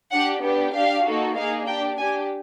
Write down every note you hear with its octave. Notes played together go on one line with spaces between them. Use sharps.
D4 G4 F#5
B3 D4 G4
D4 G4 F5
A#3 D#4 F#4 A4
A#3 D#4 G#4 F5
D4 G4 G5
D4 G4 G#5